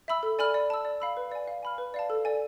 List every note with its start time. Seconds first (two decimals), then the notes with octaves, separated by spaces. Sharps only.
0.08 E5 B5 E6
0.23 A4
0.39 D5 G#5 B5 F6
0.54 D5
0.70 A5 E6
0.85 D5
1.00 F5 B5 E6
1.17 B4
1.32 D5 G#5
1.48 F5
1.63 G#5 B5 F6
1.78 B4
1.94 D5 F5 A5
2.10 A4
2.25 D5 G#5